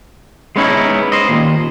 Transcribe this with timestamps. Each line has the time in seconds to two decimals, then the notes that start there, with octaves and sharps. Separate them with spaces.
0.56 G#3 B3 C#4 D#4 E4
1.12 C5 D#5
1.29 D#2 A#2